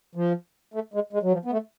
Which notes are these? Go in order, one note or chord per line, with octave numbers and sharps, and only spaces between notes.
F3
A3
G#3
G#3
F#3
F3
B3
A3